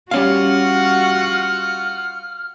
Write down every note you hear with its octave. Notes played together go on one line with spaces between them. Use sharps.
G3 C#4 F4 F#4 F5 F#5 F6